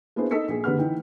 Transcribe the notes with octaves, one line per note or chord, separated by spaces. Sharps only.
A#3 B3 D4 E4 G#4 C5
D#4 A4 D#5 E6 B6 C#7
A#1 G#4
F#1 D3 G4 B4 F#5 F6
E3 D#4 G5